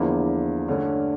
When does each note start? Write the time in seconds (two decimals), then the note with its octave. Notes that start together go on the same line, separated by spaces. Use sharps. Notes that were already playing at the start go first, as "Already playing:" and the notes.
Already playing: E2 D3 F3 A#3 E4
0.68 G2 D3 A3 C#4